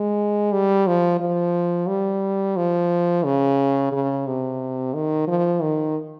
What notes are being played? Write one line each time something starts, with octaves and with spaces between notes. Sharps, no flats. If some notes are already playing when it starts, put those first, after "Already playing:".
Already playing: G#3
G3
F3
F3
G3
F3
C#3
C#3
C3
D#3
F3
D#3